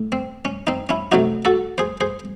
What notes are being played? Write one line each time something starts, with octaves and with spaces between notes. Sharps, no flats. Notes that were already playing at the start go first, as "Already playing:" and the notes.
Already playing: A2
C4
C#4
C4 D#4
C#4 E4
C3 F#3 A3 D#4 F#4
F#4 A4
G#4 C5
G#4 C5